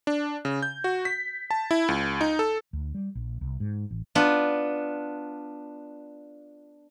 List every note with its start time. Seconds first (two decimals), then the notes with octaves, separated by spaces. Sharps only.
0.07 D4
0.45 C#3
0.63 G6
0.84 F#4
1.05 B6
1.51 A5
1.71 E4
1.88 C#2
2.21 D#4
2.39 A4
2.73 D2
2.95 G3
3.15 A#1
3.41 C2
3.60 G#2
3.91 A1
4.15 B3 D4 F4